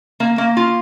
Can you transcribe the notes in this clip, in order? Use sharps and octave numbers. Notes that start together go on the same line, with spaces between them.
A#3
A#3
F4